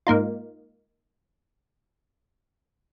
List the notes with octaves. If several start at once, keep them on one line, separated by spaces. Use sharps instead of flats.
G#2 A#3 D#4 F4